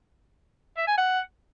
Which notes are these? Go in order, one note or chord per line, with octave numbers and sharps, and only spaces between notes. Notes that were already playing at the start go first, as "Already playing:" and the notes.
E5
G#5
F#5